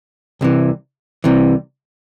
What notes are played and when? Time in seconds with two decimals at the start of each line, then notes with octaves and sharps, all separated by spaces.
0.41 C2 C3 E3
1.24 C2 C3 E3